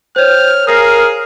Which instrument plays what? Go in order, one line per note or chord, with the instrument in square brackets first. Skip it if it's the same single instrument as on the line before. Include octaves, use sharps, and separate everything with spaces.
[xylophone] C5 C#5 [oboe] G5 [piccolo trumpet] F6
[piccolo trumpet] G#4 [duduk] A#4 [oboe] F5 [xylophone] D#6 A#6 C7